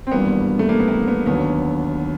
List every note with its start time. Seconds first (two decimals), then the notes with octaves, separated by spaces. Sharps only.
0.07 C4
0.11 G#1 G2 E3 G3 A#3 B3
0.59 A3
0.69 A#3
0.80 B3
0.88 A#3
1.08 B3
1.26 D#2 D3 F#3 B3